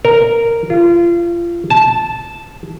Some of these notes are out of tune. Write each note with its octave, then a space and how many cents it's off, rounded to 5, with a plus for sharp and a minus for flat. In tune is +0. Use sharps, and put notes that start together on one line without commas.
A#4 -10
F4 -30
A5 -10